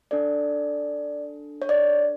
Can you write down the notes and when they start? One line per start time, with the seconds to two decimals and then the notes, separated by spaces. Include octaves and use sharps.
0.11 D4 A4 D5
1.62 C#5
1.69 D5